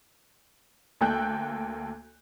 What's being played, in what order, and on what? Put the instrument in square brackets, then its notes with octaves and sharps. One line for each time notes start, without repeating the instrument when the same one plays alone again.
[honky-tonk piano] D2 A#3 A4 G5 F#6 G6